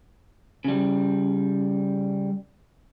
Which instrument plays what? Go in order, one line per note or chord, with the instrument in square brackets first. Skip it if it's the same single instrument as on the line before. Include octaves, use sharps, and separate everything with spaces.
[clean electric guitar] C#3 G3